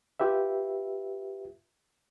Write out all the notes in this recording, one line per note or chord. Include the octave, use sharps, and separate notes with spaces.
F4 G4 B4 E5